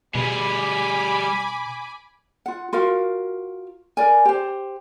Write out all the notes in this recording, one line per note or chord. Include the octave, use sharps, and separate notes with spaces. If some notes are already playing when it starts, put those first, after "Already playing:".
B2 G3 G#4 G#5 B5 D6
F4 F#5
F4 F#4 A#4 F5
A#4 D5 G#5
G4 C5